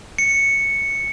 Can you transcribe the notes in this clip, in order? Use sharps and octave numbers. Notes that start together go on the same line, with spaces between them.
C#7